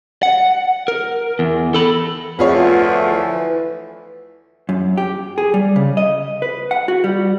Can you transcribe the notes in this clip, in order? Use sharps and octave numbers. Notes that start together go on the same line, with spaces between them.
F#5
A#4
E2
A4 B5
D2 F3 A3 B3 F4 G#4 C#5
E3
F#2
G4
G#4
G3
C#3
D#5
B4
F#5
F#4
G3